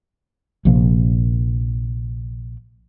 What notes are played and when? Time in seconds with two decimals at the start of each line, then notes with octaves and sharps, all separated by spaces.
0.65 A#1 C3 F3 A#3